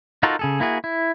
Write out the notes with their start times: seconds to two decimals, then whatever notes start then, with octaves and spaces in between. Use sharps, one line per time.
0.23 D#4 F4 F#4 A4 A#4
0.39 C#3 G#4 A4
0.60 A#3 E4 F#4 G#4
0.84 E4